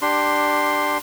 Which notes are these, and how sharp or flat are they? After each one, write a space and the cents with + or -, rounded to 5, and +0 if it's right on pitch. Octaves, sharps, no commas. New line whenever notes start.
D4 +15 G4 +0 C6 +0